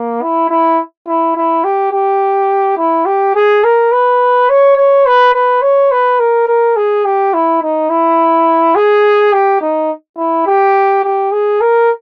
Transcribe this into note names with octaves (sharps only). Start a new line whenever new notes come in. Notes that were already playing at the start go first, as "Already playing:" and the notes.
Already playing: A#3
E4
E4
E4
E4
G4
G4
E4
G4
G#4
A#4
B4
C#5
C#5
B4
B4
C#5
B4
A#4
A#4
G#4
G4
E4
D#4
E4
G#4
G4
D#4
E4
G4
G4
G#4
A#4